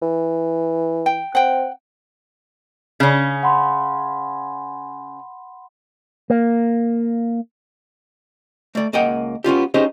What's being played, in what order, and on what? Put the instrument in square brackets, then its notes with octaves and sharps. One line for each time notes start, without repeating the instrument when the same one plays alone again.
[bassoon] E3
[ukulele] G5
[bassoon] C4 [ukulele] F#5 G5
[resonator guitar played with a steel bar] C#3 C#4
[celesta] F#5 B5 C6
[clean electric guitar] A#3
[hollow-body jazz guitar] A3 D5
C#2 A#3 D#5 F#5 G5
B3 C#4 F4 G4
C#4 D#4 G4 G#4 C5 D#5